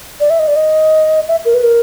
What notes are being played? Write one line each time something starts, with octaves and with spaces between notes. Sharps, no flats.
D5
E5
D#5
D5
D#5
E5
A#4
B4
A#4